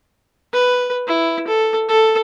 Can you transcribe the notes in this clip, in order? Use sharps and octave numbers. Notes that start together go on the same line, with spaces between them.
B4
E4
A4
A4